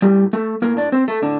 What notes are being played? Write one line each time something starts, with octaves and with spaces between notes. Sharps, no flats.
A2 G3 G4
A3 A4
A2 A#3 A#4
D4 D5
C4 C5
A3 A4
A2 D3 D4